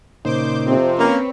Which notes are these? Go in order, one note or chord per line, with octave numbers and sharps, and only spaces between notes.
A#2 C#3 D#4 C5 D6 G6
F2 C3 C4
A#3 C#4 B4 C#5